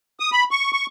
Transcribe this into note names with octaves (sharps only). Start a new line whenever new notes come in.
D#6
B5
C#6
C#6